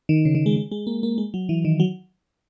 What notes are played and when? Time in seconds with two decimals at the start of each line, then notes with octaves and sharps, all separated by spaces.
0.09 D#3
0.25 C#3
0.35 D#3
0.46 G#3
0.56 G#3
0.71 G#3
0.87 A#3
1.03 A#3
1.18 G#3
1.34 F#3
1.49 E3
1.65 D#3
1.80 F#3